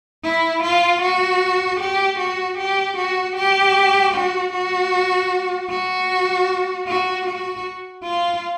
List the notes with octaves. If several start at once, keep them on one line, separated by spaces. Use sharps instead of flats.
E4
F4
F#4
G4
F#4
G4
F#4
G4
F#4
F#4
F#4
F#4
F#4
F4